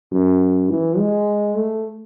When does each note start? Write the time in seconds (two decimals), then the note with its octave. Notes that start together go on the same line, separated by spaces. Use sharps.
0.12 F#2
0.70 E3
0.98 G#3
1.57 A3